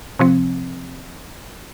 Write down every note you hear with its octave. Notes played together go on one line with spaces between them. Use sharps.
C3 F3 C4